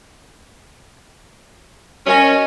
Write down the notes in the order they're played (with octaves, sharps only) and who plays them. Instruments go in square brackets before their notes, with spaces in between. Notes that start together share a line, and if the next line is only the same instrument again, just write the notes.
[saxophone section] C#4 [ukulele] A#4 D#5 G#5